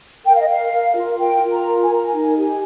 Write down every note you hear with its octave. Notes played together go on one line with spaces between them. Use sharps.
A#4 G5
F5
D#5
A#4 F5
A#4
F4
A#4 G5
F4
A#5
A#4
G#5
A#4 A#5
G#5
D#4
G4